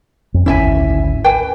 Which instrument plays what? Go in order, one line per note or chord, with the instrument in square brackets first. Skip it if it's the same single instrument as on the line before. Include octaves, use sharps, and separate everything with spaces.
[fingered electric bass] F2
[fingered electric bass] G#1 D2 C#4 [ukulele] E4 E5 G#5
[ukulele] B4 G5 G#5